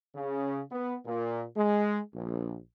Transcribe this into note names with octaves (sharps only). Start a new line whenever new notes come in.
C#3
B3
A#2
G#3
A#1